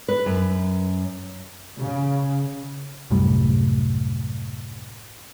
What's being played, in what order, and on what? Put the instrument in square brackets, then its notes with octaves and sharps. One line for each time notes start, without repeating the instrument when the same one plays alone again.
[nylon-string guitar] B4
F#2
[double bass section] C#3
[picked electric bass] C2 F#2 A2 G3